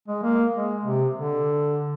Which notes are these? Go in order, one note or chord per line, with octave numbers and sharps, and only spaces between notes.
G#3
A#3
G#3
C3
D3